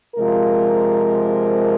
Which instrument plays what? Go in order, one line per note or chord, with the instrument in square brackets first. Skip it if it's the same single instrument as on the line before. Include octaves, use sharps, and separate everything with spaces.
[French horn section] C3 F3 G#3 F4 A#4